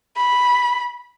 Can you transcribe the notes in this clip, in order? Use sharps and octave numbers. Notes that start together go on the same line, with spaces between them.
B5